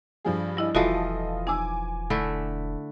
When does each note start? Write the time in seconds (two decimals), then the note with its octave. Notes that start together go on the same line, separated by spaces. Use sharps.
0.25 G2 F3 G#4
0.57 G3 E4 D#5
0.75 E1 E3 F3 F4 F#4 A4 D#5
1.47 D#4 G#5 D6 E6
2.10 D3 A3 E4